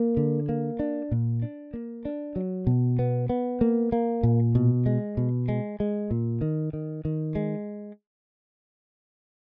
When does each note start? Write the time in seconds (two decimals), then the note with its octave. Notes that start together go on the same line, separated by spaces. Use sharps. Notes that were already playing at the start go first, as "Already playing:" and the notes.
Already playing: A#3
0.17 D3
0.49 A#3
0.79 D4
1.11 A#2
1.42 D4
1.74 A#3
2.05 D4
2.36 F#3
2.67 B2
2.99 B3
3.29 B3
3.61 A#3
3.92 A#3
4.23 A#2
4.55 B2
4.86 G#3
5.17 B2
5.48 G#3
5.80 G#3
6.11 A#2
6.41 D#3
6.73 D#3
7.05 D#3
7.35 G#3